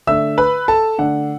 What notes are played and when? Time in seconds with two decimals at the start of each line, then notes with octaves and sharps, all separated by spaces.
0.07 D3 A3 D4 E5 E6
0.38 B4 B5
0.68 A4 A5
0.98 D3 A3 D4 F#5